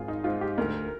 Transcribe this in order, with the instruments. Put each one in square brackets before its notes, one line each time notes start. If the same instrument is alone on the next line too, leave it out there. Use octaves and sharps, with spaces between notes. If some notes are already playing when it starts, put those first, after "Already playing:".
Already playing: [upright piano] G#1 [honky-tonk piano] F4 G#4
[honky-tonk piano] D#4
[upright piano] G#2 [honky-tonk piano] F4
[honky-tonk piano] G4
[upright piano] D2 [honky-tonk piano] A#4